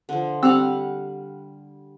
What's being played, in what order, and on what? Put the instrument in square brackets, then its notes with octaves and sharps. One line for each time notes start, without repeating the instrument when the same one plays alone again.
[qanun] D3 F3
[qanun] G3 F5 F#5 [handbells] C4 E6